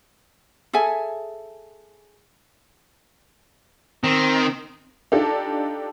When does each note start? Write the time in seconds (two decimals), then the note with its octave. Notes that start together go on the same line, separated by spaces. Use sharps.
0.73 G#4 A4 E5 G#5
4.04 D#3 C4
5.12 D4 D#4 F4 G4 A4